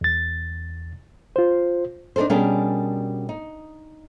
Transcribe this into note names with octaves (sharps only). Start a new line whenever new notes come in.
E2 A6
F4 C5
D4 D#4 A4 A#4 C5
B2 G3 C#4 D4 G#4 A#4
D#4